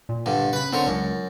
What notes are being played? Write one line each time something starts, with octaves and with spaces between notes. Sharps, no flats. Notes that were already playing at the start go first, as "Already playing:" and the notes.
A#2
G2 D3
C#3 B4 B5
D3 C4 A#4 C#5
C#2 F#2